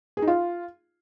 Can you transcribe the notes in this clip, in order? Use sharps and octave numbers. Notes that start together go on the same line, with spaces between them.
G#4
D#4
F4